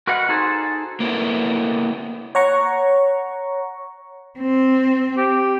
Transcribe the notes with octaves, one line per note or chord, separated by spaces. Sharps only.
F#4 A#4 B4 D#5 F#5
D#4 F#4 G#4 A4 C5
A#3 B3 E4 A4
C#5 F#5 A#5 C#6
C4
G4